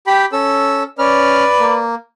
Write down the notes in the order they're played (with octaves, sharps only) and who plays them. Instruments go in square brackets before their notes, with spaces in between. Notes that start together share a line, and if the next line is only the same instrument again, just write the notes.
[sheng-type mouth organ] G4 G5 B5
C#4 A4 E6
[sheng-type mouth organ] C#4 F6 [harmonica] B4 D5
[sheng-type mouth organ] A#3